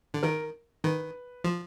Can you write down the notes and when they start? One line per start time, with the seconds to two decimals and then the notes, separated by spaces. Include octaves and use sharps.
0.14 D3
0.23 D#3 A#4
0.84 D#3 B4
1.44 F3